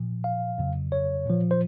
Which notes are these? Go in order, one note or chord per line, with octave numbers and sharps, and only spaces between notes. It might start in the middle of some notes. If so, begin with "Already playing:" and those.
Already playing: A#2 F3
F5
F2 C#3 F#3
C#5
A#2 F3
C5